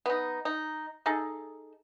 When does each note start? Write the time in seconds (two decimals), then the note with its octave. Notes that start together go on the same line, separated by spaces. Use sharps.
0.06 B3 D#4
0.45 D#4
1.06 D#4 G#4 A4